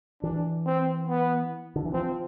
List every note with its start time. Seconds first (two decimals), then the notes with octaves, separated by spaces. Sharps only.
0.23 E3 D4
0.66 C4
1.08 B3
1.76 D3
1.85 E3
1.93 F3 C4